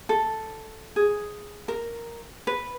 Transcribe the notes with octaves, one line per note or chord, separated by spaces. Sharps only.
A4
G#4
A#4
B4